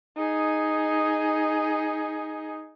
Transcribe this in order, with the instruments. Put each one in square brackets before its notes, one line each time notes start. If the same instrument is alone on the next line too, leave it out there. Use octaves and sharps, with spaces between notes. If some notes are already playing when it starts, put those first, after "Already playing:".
[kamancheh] D#4 G#4